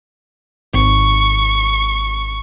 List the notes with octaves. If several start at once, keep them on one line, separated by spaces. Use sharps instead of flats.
G#1 C#6